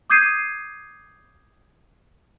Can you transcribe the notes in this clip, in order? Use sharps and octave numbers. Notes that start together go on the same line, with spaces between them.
D6 D#6 G6 G#6 C7 D#7